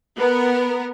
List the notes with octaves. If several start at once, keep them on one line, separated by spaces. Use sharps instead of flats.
B3 A#4